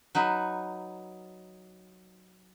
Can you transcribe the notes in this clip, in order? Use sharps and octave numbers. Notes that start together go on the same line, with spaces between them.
F#3 D#4 B4